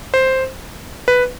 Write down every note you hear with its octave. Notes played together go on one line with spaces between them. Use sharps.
C5
B4